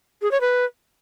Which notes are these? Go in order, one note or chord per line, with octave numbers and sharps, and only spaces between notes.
G#4
C#5
B4